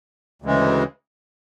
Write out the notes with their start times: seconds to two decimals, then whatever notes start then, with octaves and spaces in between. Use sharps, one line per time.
0.42 D2 C#3 E3 G#3